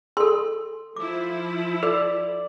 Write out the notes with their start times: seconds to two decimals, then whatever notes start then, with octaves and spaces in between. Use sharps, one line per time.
0.17 G#4 A4 C6
0.96 F3 E4 D6
1.83 A4 D5